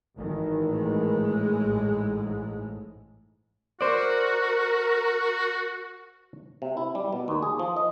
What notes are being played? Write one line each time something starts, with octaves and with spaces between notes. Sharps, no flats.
G#1 D#3 E3
A2 G#3
A1 G#2
F#4 A#4 C5 D5
C3
E4
G3
B2
D#2
G#4
F3
D#5